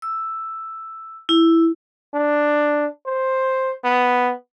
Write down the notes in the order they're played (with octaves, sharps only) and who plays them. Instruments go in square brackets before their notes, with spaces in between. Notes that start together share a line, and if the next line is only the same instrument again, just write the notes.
[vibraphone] E6
E4
[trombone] D4
C5
B3